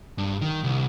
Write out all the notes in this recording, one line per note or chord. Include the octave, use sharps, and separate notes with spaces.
G2
D#3
C2